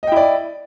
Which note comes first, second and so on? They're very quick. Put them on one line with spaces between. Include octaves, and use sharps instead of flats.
D#5 G5 E4 D5